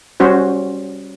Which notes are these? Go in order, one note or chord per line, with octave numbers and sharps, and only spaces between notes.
G3 C#4 F#4 C5